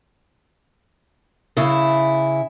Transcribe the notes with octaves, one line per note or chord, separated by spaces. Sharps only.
C#3 E4